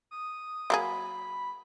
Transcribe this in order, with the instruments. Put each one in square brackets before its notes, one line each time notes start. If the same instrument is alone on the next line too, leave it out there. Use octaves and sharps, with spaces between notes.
[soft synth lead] D#6
[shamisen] F#3 A#3 G#4 [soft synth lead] B5